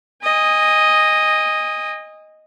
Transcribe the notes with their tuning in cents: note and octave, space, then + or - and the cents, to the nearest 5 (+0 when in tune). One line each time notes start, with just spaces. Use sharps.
D#5 +0 G#5 -30